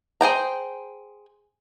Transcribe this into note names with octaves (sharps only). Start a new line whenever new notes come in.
G#4 C5 G5 A#5